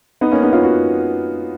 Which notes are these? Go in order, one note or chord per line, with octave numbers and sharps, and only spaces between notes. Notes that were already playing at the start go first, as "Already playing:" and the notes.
B3 D#4
A#3 C#4
B3 D#4
C#4 F4
F#4